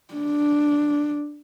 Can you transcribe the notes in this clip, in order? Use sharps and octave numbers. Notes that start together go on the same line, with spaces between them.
D4